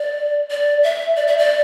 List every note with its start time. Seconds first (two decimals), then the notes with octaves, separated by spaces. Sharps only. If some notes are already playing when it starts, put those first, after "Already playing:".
Already playing: D5
0.51 D5
0.84 E5
1.16 D5
1.27 E5
1.38 D5